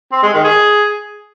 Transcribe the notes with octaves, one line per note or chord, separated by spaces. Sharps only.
C4
G#3
D#3
G#4